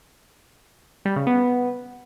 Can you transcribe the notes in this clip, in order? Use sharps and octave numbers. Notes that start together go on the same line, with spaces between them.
G3
C#3
B3